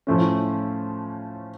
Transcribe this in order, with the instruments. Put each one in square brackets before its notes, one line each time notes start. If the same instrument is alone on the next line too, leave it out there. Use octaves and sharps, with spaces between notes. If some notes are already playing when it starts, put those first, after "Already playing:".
[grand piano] A2 F3 A3 C#4